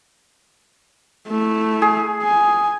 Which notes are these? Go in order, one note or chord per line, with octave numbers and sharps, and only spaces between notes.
A3 E4
G#4
G#5